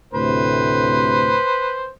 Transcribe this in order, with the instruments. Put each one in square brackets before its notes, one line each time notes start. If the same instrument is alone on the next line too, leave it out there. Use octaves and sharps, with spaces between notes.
[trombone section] D2 A2 C3 [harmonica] B4 C5